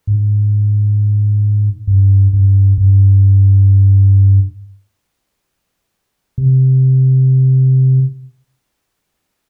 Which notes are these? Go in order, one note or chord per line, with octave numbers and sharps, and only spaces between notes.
G#2
G2
G2
G2
C3